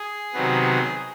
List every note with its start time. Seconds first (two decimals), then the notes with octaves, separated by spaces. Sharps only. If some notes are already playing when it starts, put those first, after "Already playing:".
Already playing: G#4
0.34 C3 D#3 F#3 B3